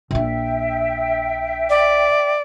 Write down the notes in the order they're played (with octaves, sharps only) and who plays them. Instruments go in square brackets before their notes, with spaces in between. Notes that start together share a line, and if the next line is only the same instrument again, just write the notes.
[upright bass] A#1 D4 [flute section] E5 G5
[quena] D5